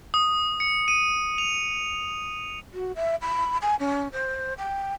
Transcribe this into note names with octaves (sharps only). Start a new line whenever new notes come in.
D#6
C#7
D#7
F7
F#4
E5
B5
G#5
C#4
C5
G5